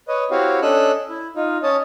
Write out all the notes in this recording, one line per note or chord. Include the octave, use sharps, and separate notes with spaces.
B4 C#5 D#5
C4 E4 F#4 G4 C#5 F5
C#4 D4 A4 D#5 E6 F#6
E4
D#4 F4
C#4 C#5 D#5 A5 D#6